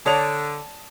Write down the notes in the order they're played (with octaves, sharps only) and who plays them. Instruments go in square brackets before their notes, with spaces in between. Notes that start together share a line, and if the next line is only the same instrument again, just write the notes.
[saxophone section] D3 [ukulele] C#5 D5 [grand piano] A5 D#6 F7